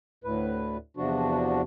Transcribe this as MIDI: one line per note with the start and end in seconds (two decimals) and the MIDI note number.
0.24 0.77 38
0.24 0.77 45
0.24 0.77 71
0.97 1.62 40
0.97 1.62 48
0.97 1.62 53
0.97 1.62 62
0.97 1.62 66